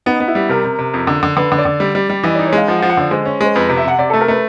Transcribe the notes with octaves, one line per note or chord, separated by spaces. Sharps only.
B3 D#4
B3
E4
G3
C3 A#4
C3
C3
F2
D3
D3
D3 B4
D3
D5
D3
G3
G3
G3
E3 D#5
D#4 D5
C#5
G#3 F5
F3 F#5
F#5
F3
F#5
D3 D5
G#3 C5
C#4
G#3 C5
F2 B4
C3 B4
E5
C3 F#5
C3 D5
A3 A4
A#4
A3 B4